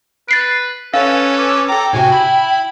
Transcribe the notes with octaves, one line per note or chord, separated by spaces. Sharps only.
B4 A6 C7 D7
C#4 A4 B4 C#5 F5
D6
A4 G5 A#5 D6
A2 C3 F#4 G#5
E4 B5